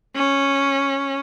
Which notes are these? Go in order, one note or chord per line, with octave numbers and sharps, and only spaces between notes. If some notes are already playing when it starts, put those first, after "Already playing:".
C#4